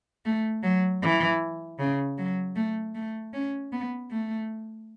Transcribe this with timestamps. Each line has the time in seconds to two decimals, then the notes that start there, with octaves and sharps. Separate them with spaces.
0.25 A3
0.63 F#3
1.02 E3
1.79 C#3
2.18 F#3
2.56 A3
2.95 A3
3.33 C#4
3.72 B3
4.11 A3